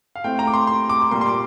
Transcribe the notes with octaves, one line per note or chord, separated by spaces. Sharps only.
F5
A2 A3 C4 G5
A#5
D6
C6
C6
D6
D6
A#2 G3 A#3 C6
C6
D6